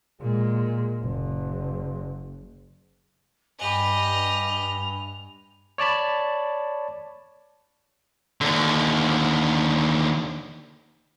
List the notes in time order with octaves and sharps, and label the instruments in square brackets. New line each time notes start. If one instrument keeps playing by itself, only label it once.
[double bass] A#2 G#3
F#1
[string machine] G2 [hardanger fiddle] G4 D#5 [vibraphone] G#5 B5 [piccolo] F7
[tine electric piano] C#5 D5 A5 B5
[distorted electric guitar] D#2 D3